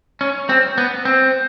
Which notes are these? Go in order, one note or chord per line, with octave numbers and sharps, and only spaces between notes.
C#4
C4
B3
C4